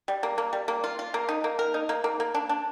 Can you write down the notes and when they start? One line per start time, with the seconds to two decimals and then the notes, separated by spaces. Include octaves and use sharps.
0.08 G3
0.23 A#3
0.38 A#3
0.53 G3
0.68 A#3
0.84 F4
0.99 F4
1.14 A#3
1.29 D#4
1.44 A#3
1.59 A#4
1.74 D#4
1.89 A#3
2.04 A#3
2.20 A#3
2.35 D4
2.49 D4